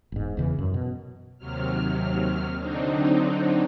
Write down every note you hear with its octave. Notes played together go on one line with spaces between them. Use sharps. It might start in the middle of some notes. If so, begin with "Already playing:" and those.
E1 G#2
E2 C#3 E3
F#2
B2
D#2 C3 F#3 F6
D3 F#3 C4 D4 D#4